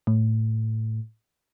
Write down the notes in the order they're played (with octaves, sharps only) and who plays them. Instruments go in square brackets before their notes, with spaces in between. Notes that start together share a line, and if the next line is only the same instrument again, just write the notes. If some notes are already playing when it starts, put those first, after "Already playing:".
[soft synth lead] A2